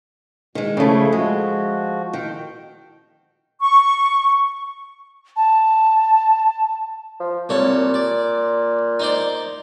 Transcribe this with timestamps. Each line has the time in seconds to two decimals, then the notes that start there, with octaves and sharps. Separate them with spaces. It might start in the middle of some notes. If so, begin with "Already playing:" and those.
0.55 B2 D#3 G#3
0.77 C#3 F3 A3 E4 G#4
1.12 F3 G#3 F#4
2.13 D#3 G5
3.60 C#6
5.36 A5
7.20 F3
7.49 C2 A#2 A4 C#5
7.94 D5
8.99 D#4 C5 D5